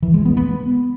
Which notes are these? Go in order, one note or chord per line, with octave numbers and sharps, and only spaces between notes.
E3
G#3
B3
B3